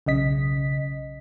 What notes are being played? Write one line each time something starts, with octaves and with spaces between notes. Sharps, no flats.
B1 C#3 D#5 B6